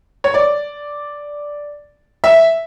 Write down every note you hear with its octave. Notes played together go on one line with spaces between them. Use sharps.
C#5
D5
E5